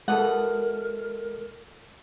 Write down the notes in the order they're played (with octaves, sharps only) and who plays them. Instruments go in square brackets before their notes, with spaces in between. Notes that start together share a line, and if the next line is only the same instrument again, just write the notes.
[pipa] B2 E3 F#5 [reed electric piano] G#3 A4 [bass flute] A#4